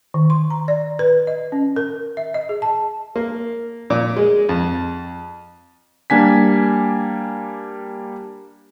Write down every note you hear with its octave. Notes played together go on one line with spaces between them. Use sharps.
D#3
C6
A#5
D5
B4
D#5
C#4
A#4
E5
D#5
G#4
A5
A#3
A#2
G#3
F2
G3 A#3 D4 G#5 B6